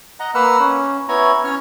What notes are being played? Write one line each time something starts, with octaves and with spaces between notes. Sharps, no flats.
D#5 F#5 A#5
A#3 B4 F#5 E6 F6
C#4
B3 E4 C#5 G#5 A#5
C#4 C#5 F6